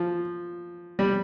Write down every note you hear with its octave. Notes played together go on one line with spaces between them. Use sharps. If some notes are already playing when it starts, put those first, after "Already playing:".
Already playing: F3
G3